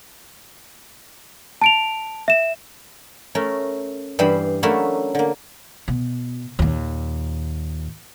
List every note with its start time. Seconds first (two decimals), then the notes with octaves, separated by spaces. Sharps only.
1.61 A5 D7 F7
2.28 E5 E7
3.35 A3 C#4 A#4
4.19 G2 E3 G3 G#4 C5 B5
4.63 F#3 A3 A#3 C#4 D4 E4
5.15 D3 A#3
5.88 B2
6.59 D#2 A#2